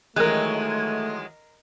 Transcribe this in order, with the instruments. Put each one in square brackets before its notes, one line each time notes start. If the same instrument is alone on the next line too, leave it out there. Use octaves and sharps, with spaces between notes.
[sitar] D#3 E3 F#3 [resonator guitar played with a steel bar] G#3 [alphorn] A3 [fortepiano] A#4 F#6